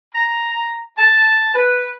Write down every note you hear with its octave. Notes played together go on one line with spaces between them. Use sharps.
A#5
A5
B4